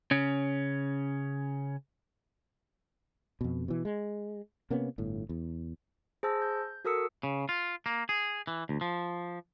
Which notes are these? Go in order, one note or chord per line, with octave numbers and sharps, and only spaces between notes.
C#3 C#4
F2 B2
B2 E3
G#3
C3 A#3 B3 C#4
G1 A2
E2
G#4 C5 A5 E6 A#6
G6
F#4 A4 A#4 D#6 E6 C#7
C#3
F4
A#3
G#4
E3
D2
F3